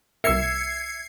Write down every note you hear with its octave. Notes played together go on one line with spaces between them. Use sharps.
C2 A#4 E5 E6 G#6 C7 C#7